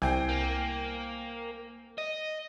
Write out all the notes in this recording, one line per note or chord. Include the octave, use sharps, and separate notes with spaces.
C2 C4 G5 G#5
A#3
D#5